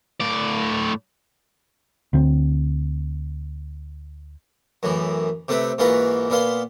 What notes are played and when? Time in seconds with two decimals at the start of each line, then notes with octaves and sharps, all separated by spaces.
0.21 A2 D5
2.13 D2 D3 C4
4.83 F#2 A2 E3
5.48 C3 A3 C4 B4
5.78 G#2 E3 A#3 F4 F#4 B4
6.30 A#2 B3 F5 C6